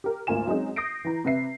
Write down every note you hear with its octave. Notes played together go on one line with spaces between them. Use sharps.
G4 A#4
G#1 D2 A#3 F4 G#5 E7
F#3 G#3 C4 C#4 D#4 G#4
D#6 G6 A#6 C7 D7
E3 E4 A#5
C3 B4 E5 C7